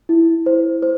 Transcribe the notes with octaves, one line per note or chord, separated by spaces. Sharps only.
E4
C5
C5